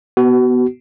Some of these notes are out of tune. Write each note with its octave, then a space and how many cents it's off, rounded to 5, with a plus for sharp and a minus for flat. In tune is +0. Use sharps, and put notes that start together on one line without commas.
B3 +0 F#4 +30